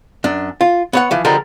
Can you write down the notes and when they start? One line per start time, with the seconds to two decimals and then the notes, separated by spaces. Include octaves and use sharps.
0.24 F#2 D4
0.61 F4
0.93 B3 C#5 F#5
1.11 E3 F3
1.25 D3 F3 G3 G#3 A4 A#4